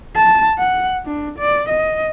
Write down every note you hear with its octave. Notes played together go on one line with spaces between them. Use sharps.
A5
F#5
D4
D5
D#5